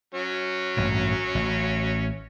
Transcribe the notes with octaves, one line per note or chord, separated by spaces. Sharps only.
F#3 C#4
A1 G2 A#2
A1